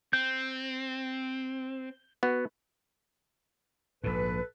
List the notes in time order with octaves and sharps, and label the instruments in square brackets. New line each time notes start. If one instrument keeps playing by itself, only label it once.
[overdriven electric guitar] C4 [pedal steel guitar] G6
[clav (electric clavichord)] B3 F#4
[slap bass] A#1 G#2 [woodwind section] A4 B4